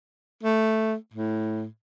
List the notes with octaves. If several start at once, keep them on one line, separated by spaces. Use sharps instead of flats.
A3
A2